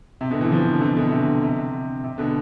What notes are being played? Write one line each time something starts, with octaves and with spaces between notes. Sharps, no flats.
C3
B2 D3
C3 E3
D3 F3
C3 E3
B2 D3
C3
C3
C3
B2 D3